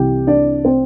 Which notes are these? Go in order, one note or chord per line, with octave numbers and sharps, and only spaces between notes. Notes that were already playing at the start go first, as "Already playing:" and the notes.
Already playing: C2 C3 E3 G4 G5
D4 D5
C4 C5